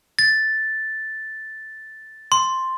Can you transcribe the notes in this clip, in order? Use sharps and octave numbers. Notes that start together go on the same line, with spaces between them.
A6
C6